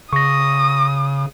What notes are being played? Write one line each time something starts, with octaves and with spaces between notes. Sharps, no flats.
C#3 C#6 D#6 A#6